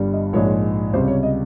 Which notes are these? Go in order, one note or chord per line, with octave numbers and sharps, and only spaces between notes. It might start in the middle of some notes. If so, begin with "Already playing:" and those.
Already playing: G1 G2 G3
D#5
A#1 G#2 F3 G#3 C#5
C#2 C3 G3 C5
C#5
D#5